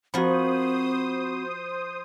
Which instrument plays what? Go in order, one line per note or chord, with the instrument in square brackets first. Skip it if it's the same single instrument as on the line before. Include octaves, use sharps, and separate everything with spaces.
[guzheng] F3 A#4 [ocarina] C4 [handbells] F#4 F#5 B5 [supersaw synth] C5 D#6